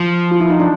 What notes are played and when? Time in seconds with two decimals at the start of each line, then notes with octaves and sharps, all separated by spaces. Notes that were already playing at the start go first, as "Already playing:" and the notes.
Already playing: F3
0.31 F4
0.40 E4
0.50 D#4
0.60 D4